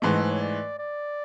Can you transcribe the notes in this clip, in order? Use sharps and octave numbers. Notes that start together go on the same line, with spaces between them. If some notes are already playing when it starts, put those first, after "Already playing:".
G#2 E3 A3 D#5
C5
C#5
D5
D5